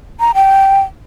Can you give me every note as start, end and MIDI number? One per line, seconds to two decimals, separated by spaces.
0.20 0.32 82
0.35 0.81 79